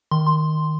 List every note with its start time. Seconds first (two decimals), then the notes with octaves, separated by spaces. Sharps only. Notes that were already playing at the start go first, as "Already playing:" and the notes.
0.11 D#3 C6
0.27 C6